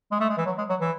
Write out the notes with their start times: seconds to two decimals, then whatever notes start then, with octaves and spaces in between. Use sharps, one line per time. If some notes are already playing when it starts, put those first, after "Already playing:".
0.12 G#3
0.20 A3
0.29 G#3
0.37 E3
0.46 F#3
0.58 G#3
0.69 F#3
0.81 E3